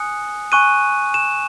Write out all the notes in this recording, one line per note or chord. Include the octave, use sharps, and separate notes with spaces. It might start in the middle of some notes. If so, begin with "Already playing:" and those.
Already playing: G#5 D#6 F#6 C#7
G#5 C#6 F#6 D#7
E7